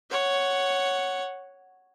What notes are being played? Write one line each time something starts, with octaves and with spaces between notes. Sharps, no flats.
C#5 F#5